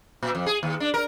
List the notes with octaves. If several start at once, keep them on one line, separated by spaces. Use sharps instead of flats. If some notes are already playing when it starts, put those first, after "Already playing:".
A#2
F2
G#4
D#2
D4
A#4